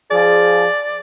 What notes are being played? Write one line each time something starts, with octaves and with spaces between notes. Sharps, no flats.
F3 G#4 D5